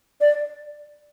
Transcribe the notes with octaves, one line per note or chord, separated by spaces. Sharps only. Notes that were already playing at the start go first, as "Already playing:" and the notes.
D5